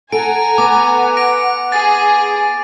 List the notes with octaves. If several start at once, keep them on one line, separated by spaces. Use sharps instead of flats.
A4 F#5 G#5 A#5 D7
B3 D6
A#6 D7
G#4 A6